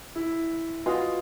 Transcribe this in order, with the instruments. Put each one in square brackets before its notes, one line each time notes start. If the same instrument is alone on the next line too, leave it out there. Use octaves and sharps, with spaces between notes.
[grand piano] E4
[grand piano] F4 [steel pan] F#4 B4 D#5 G#5 C6